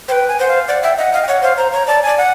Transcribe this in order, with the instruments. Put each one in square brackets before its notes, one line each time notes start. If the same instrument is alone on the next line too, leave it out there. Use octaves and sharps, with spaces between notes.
[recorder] B4 C5 [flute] G5
[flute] G#5
[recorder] C5 [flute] F#5
[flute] F5
[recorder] D5 [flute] F#5
[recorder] E5 [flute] G5
[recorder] D#5 [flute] F#5
[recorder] D#5 [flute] F5
[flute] G5
[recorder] C#5 [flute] F#5
[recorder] C5 [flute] F5
[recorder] C5 [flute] A#5
[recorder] C#5 [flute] A#5
[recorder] D5 [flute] A5
[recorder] D5 [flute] G#5
[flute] F#5